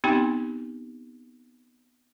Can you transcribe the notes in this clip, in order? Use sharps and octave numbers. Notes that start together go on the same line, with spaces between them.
B3 C4 D#4 G4 G5 B5